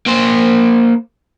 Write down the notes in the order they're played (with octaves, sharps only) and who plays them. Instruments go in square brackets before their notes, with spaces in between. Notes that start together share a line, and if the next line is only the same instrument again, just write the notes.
[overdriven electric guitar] A#3 C5